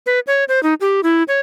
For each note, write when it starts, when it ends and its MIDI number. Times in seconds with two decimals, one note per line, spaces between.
0.06 0.20 71
0.27 0.44 73
0.48 0.62 72
0.63 0.74 63
0.81 1.01 67
1.03 1.23 64
1.28 1.40 73